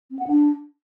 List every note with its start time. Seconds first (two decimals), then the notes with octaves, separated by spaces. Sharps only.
0.11 C4
0.19 F#5
0.27 D4